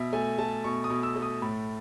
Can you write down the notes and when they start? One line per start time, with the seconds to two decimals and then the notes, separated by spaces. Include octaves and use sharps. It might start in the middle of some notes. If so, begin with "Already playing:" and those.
Already playing: B2 E5
0.13 A3 G#5
0.38 A3 A5
0.64 B2 C#6
0.84 D#6
0.90 B2
1.03 E6
1.16 A3
1.22 D#6
1.42 A2 B5